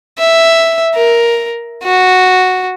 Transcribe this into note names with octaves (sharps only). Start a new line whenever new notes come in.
E5
A#4
F#4